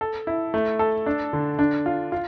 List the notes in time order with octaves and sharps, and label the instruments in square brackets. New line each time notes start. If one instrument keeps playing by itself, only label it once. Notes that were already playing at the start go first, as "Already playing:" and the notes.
[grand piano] A4
E4
A3
A4
D4
D3
D4
F4
F4